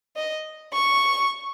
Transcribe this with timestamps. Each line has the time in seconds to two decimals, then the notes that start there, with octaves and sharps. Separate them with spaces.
0.16 D#5
0.73 C#6